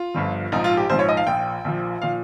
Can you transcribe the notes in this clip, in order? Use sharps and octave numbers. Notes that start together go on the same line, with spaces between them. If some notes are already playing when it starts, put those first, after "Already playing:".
Already playing: F4
G1 G2 F3
A#1 G#2 F3 D#4
F4
G4
A#1 G#2 F3 C5
C#5
D#5
F5
A#1 A#2 F3 G5
A#1 A#2 F3
A#2 F3 F5